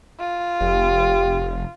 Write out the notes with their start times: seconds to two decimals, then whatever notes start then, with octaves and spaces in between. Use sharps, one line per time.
0.20 F4
0.61 F1 G4